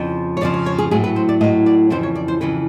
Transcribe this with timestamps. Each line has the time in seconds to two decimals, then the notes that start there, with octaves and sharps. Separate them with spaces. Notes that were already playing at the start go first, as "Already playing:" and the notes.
Already playing: F2 C#3 F3
0.37 C#5
0.41 F2 C#3 F3 D5
0.54 C#5
0.66 C#5
0.78 G#4
0.91 A2 F#3 G#4
1.04 B4
1.16 C5
1.29 D5
1.41 A2 D#5
1.44 F#3
1.66 D5
1.90 F2 C#3 E3 C5
2.03 C#5
2.15 D5
2.28 C5
2.41 F2 C#3 E3 B4